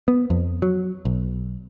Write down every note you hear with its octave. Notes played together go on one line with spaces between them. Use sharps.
B3
F2
F#3
B1